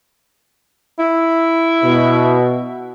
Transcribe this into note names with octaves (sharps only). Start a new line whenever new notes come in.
E4
B2